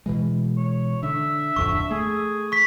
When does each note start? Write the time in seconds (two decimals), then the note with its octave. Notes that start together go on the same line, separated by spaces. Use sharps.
0.06 B2 E3 G#3
0.57 C#5
1.03 D3 E5
1.56 D1 F2 D3 C#6
1.91 A3 G#4
2.52 C#6 B6